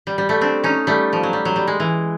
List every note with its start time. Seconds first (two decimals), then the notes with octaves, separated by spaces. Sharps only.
0.07 G3
0.18 G3
0.29 G3 A3
0.41 C4 D4
0.64 C#4 D#4
0.87 G3 A3
1.13 F3
1.23 F#3
1.33 G3
1.45 F#3
1.56 G3
1.67 G#3
1.80 E3